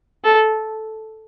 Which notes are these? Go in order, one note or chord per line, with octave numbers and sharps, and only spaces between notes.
A4